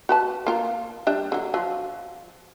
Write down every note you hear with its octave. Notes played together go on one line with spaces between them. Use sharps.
F#4 B4 A5
A#3 F4 A#4
G3 D4 E5
D3 F#3
F3 F#3